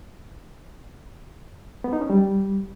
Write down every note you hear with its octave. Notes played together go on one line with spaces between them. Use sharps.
B3
D#4
C#4
G3